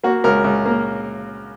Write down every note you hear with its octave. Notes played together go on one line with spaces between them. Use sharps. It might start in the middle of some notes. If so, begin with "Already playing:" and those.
A#3 F#4
C#2 A#4
C#2
A#3